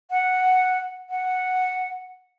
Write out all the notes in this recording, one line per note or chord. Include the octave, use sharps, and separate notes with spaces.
F#5
F#5